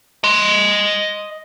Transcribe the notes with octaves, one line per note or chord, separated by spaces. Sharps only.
D#5 C6